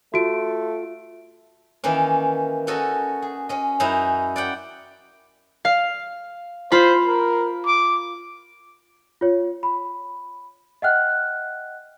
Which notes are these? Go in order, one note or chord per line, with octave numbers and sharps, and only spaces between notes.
A3 F4 F#4 D7
D#3 E3 A#3 C#4
C#4 D#4 F#4 A4 D#5
G#4
C#4 D#5
F#2 C#4 D#4 E4 A#5
D5 F#5 G5
F5
F4 C5 B5
A#4
D6
F4 C#5
B5
D#5 E5 F#5 G5 F6 F#6